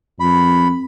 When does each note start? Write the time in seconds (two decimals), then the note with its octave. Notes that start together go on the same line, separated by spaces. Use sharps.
0.20 F2 B5